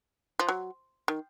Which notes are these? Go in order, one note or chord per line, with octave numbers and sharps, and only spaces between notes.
F3
F#3
D#3